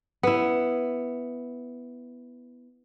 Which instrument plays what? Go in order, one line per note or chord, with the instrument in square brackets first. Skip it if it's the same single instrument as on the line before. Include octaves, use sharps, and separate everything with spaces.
[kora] B3 E4